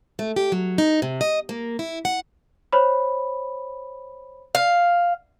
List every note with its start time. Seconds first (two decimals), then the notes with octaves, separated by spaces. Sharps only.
0.19 A3
0.36 G4
0.52 F#3
0.78 D#4
1.02 C3
1.21 D#5
1.49 A#3
1.79 E4
2.05 F#5
2.72 C5 C#5 B5
4.55 F5